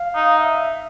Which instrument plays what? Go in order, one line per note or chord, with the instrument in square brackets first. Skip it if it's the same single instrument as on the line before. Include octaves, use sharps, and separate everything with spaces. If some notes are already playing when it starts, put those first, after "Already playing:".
Already playing: [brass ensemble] F5
[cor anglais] D#4
[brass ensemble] E5